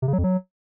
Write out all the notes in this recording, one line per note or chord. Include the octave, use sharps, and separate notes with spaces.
C3
C#3
F#3
F2
F#3